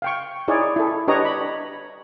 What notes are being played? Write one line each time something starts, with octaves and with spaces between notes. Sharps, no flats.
F5 G5 C#6
D#4 E4 G#4 C#5 D5
E4 A4
D4 G4 B4 C#5 D#5 A#5
B5